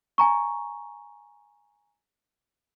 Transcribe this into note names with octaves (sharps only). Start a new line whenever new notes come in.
G#5 A#5 C#6